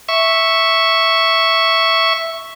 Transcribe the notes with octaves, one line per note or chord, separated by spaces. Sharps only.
E5 C#6